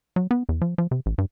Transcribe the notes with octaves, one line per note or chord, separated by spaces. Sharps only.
F#3
B3
E2
F3
F3
C3
A1
G2